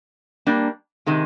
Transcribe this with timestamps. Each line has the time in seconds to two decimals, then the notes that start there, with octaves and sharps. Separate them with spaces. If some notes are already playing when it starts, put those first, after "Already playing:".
0.47 G3 A#3 D4
1.06 C3 D#3 G#3